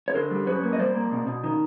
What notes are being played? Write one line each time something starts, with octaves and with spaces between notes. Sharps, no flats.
C#5
D3 A#4 C5
G3
F#2 B4 C#5
A#3
D#5
G3 C5 D5
A#3
B2
B2
D#3